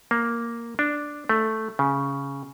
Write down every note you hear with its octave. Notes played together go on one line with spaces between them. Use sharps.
A#3
D4
A3
C#3